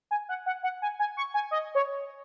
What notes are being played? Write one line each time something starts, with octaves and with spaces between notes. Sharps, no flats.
G#5
F#5
F#5
F#5
G#5
G#5
C#6
G#5
D#5
C#5